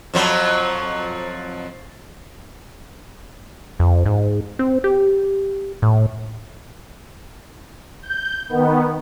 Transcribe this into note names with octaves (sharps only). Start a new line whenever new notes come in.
F2 F3 F#3
F2
G#2
C4
G4
A2
G6
D#3 B3